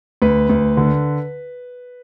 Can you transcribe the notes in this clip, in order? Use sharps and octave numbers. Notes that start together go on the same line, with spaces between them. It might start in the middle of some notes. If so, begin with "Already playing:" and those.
D2 B4
D2
D3